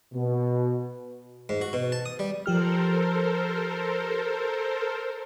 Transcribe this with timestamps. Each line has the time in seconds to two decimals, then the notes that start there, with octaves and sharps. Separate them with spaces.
0.14 B2
1.49 G#2
1.61 F#4
1.73 B2
1.92 A5
2.06 D#6
2.19 G3
2.46 F3 G4 A4 A#4 C5 F6